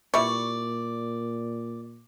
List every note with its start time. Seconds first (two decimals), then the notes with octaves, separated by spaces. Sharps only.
0.14 A#2 G3 E4 D5 C#6